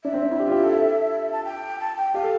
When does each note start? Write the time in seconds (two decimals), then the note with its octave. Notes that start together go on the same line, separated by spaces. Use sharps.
0.04 D4 E5
0.14 C4
0.23 D4
0.31 E4
0.40 G4
0.48 F4
0.52 G4
0.63 A4
0.75 A4
1.32 A5
1.45 G5
1.80 A5
1.96 G5
2.14 G4 F5
2.23 A4